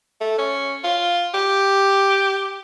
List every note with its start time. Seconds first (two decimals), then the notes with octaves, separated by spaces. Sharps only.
0.21 A3
0.39 C#4
0.84 F4
1.34 G4